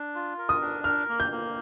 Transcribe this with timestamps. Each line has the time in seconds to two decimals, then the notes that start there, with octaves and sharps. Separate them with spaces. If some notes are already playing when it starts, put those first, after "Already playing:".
Already playing: D4
0.15 F4
0.38 A#4
0.49 D#6
0.62 D4
0.84 A#4 F6
1.09 A#3
1.20 G6
1.32 A#3